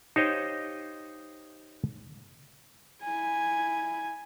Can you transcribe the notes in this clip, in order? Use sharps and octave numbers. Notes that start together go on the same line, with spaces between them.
D#4 G4 C5 C#5 D#5 F5
E4 G#5